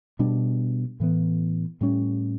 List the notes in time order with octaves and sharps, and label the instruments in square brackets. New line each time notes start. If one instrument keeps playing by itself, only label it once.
[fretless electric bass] B2 G3 D4
A2 E3 B3
A2 G3 C#4